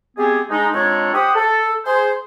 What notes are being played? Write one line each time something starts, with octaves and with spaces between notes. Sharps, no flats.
G#3 B3 C4 G4 G#4
G#3 D4 D#4
F2 G#3 D4 D#4 A4 C#5
G4 C5 F#5 D#6
A4
G#4 C5